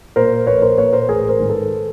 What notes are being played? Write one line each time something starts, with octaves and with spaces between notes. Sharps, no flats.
A#2 A#4 C5
A#1 B4 C#5
A#4 C5
A#2 B4 C#5
A#4 C5
A1 G#4 A#4
A#4 C5
G#2 D#3
A4 B4